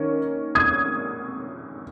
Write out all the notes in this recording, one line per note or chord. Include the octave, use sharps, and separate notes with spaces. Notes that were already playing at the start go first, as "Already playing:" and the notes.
Already playing: D#3 A#3 C#4
D#6 G#6